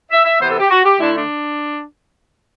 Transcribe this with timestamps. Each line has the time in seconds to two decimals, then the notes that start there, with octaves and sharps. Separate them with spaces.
0.10 E5
0.25 E5
0.39 C3 E3 B3 C5
0.50 A4
0.59 G4
0.70 F#4
0.85 G4
0.99 D3 A3 D4 E4
1.15 D4